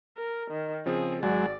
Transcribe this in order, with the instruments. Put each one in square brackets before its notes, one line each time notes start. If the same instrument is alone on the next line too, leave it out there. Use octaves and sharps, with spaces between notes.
[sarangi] A#4
D#3
[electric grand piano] C#3 F3 C4 [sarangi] G#4
[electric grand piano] G#1 F#4 [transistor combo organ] F#3 G#3 [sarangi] D5